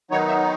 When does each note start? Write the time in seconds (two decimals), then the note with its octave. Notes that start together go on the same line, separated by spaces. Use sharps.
0.11 D#3 F#3 B3 D#4 C#5
0.28 E5